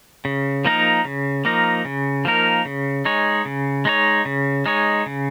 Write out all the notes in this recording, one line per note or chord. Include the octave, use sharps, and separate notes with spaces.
C#3
F3 A#3 D#4 A#4
C#3
F3 A#3 D#4 A#4
C#3
F3 A#3 D#4 A#4
C#3
G#3 D#4 C#5
C#3
G#3 D#4 C#5
C#3
G#3 D#4 C#5
C#3